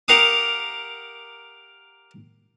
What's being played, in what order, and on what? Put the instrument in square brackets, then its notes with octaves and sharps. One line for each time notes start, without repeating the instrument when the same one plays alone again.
[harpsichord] G4 A#4 F5 F#5 D6 D#6